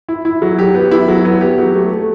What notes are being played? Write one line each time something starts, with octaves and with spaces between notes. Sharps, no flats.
E4
E4
F#3
G4
B3
E4
F#3
B3
G4
F#3
A3
A3